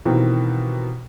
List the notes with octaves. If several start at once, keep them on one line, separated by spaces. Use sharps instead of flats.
B2 D#3 E3 A#3 C4 G4